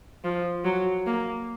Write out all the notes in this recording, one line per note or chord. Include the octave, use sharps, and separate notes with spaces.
F3
F#3
A#3